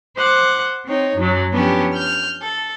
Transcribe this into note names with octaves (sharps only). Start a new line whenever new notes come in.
C5 F#5 D6 F#6
C4 D#4 C#5
F#2 F#3
F3 B3 C#4 D4 G4
F6 G6
A4